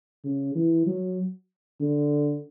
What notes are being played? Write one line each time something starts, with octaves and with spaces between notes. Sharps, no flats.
C#3
E3
F#3
D3